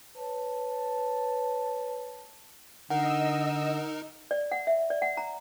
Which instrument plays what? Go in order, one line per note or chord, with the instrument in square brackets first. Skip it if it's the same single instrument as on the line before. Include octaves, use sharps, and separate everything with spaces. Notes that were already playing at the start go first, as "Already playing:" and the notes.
[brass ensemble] B4 C#5 A5
[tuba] D3 [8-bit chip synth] D#4 A#4 [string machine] D#5 E6 [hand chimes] F#5
[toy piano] D5
F#5
E5
D5
F#5
A#5